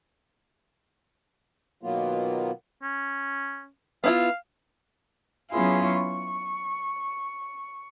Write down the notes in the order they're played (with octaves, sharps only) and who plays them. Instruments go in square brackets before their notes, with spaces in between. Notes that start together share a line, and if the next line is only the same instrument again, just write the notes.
[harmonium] B2 D#3 F#3 A#3 B3 F4
[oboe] C#4
[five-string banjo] B3 E4 F4 [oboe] F5
[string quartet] F#3 B3 C#4 E4 F4 G#4
C#6